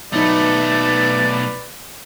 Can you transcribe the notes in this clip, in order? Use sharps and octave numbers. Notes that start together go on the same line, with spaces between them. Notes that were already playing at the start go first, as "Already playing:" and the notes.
B1 F#3 A3 D#4 B4 D5